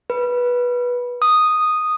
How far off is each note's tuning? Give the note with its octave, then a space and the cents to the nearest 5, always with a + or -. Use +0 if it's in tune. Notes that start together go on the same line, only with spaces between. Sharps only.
B4 -15
D#6 -5